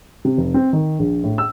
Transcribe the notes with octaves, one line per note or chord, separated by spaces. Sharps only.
C3
F1
C4
D#3
A#1
A2
E6